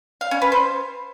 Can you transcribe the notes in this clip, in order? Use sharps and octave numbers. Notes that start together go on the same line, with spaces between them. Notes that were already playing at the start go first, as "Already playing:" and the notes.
F5
C#4
B4
C5